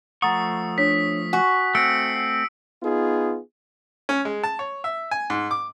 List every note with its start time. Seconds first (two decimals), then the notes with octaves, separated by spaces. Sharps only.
0.22 F3 A3 F#5 A#5 C#6 D#6 A6
0.78 D4 C#5 B6
1.33 F#4 G#5
1.75 A3 C4 E6 C#7 D7
2.83 B3 D#4 F4 G#4
4.09 C#4
4.25 G#3
4.44 A5
4.59 C#5
4.84 E5
5.11 G#5
5.30 G#2
5.51 D6